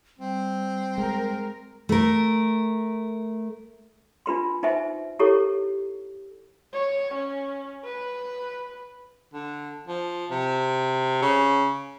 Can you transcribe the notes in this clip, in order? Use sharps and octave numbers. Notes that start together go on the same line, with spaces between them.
G3 C4
G#3 A#4
A3 A#4
D4 F4 B4 C6
D#4 B4 C5 E5 G#5
E4 G4 A4 A#4 C#5
C#5
C#4
B4
D3
F3
C3
C#3